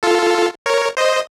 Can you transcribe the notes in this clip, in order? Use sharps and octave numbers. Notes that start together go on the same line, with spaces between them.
F4 A4
A#4 C#5
C5 D#5